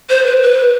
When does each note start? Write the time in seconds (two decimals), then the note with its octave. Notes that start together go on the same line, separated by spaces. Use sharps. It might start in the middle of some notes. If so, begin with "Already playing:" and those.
0.10 C5
0.26 B4
0.42 B4